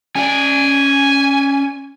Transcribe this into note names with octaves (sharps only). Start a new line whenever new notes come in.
C#4 D5 G#5